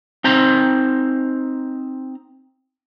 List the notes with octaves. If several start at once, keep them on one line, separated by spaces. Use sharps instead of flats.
C4 D#4 C5 A#5